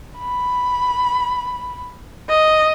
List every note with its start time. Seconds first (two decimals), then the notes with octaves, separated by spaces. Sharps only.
0.18 B5
2.29 D#5